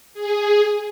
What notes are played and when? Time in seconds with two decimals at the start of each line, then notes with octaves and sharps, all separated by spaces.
0.14 G#4